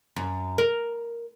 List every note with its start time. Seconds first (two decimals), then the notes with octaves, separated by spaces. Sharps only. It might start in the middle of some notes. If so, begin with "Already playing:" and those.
0.16 F#2
0.58 A#4